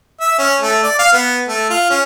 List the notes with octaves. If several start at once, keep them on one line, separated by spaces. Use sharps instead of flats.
E5
C#4
A3
D5
F5
B3
A3
F4
C#4